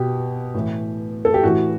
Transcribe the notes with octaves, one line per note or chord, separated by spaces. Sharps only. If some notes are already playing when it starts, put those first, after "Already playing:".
Already playing: B2 G4
A2 E3
A4
G4
A2 E3 F#4